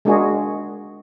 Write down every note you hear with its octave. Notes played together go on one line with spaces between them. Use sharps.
G#3 A#3 D4 F#4 G#4